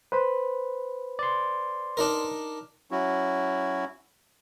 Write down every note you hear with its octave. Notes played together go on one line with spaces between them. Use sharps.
B4 C5 B5
D5 C6
D4 D#4 A#4
F#3 C#4 E4 F#4